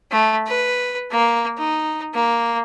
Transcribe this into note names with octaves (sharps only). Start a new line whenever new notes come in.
A3
B4
A#3
D#4
A#3